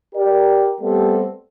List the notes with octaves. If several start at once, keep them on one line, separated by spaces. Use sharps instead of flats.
G4 A#4 D5
G3 A3 B3 C4 G4 A4